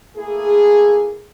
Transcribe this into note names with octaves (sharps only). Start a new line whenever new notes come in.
A3 A#3 E4 G#4